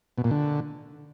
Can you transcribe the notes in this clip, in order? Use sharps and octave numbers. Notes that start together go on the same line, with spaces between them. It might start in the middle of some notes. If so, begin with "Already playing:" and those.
B2
A#2
D3